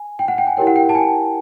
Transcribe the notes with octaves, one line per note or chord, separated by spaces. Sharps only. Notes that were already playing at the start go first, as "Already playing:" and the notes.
Already playing: G#5
G5
F#5
G5
G#5
E4 G4 A#4 C#5 G5
F#5
G5
A5
G#5